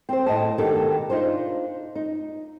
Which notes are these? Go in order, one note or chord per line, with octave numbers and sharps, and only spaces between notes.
C4 C5
A2 D#5 A5
B2 D#3 D4 G4 A4
D4 D#4 F4 C5
D#4